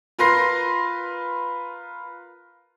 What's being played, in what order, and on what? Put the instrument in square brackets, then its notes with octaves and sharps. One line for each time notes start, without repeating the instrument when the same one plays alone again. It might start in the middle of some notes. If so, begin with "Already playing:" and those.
[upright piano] F4 A#4 B4 C6 A#6 C7